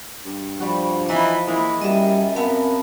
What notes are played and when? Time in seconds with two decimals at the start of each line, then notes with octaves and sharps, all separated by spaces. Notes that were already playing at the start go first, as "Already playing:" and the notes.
0.25 G2
0.60 F3 G3 F#4
1.09 E3 D#4 E4 D#5
1.47 E3 G#3 A#3 E4
1.81 F#2 G3 D#5 E5
2.36 B3 C4 A#4 E5 F5 A5